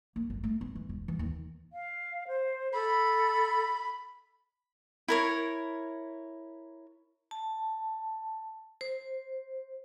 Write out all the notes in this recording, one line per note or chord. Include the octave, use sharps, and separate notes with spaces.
A#3
G1
A3
B3
E3
E1
E3
D#2
F5
C5
A4 B5
E4 A#4 C#5
A5
C5